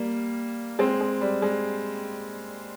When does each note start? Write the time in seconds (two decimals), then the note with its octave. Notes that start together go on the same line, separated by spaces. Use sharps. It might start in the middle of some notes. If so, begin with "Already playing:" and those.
Already playing: G3 A#3
0.79 G#3 C4
1.01 G#3
1.21 G3
1.42 G#3